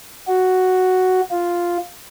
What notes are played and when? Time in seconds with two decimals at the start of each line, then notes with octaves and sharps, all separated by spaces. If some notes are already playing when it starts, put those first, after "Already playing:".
0.27 F#4
1.31 F4